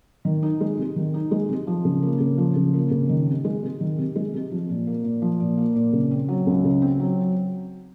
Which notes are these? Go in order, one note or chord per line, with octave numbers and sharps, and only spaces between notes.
D#3
D#4
G#3
C3
D#3
D#4
G#3
C3
F3
C#3
A#3
C#3
F3
C#3
A#3
C#3
D#3
C3
G#3
C3
D#3
C3
G#3
C3
F3
A#2
A#3
A#2
F3
A#2
A#3
A#2
C#3
C4
F#3
C#2
C#3
C4
F#3